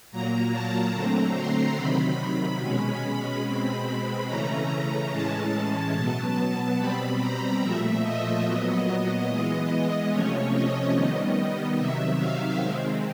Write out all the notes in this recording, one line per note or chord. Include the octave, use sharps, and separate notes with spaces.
A#2 F#3 A#3 A#5
A5
D3 F#3 A3 C4 A#5
C6
C3 D#3 F#3 B5
B2 G#3 C#4
B2 G#3 C4 B5
C#3 E3 A3 C#4 A#5
A2 E3 G#3 C#4 A5
B2 F#3 B3
B2 G3 C4 B5
A#5
A#2 F3 A3 E5
D#5
A#2 F#3 B3
E3 G#3 B3
C3 F3 A3 C#4 C#5
D#5
D#3 G3 B3 D#5
C3 D#3 F#3 E5
F5
D#3 G#3 C4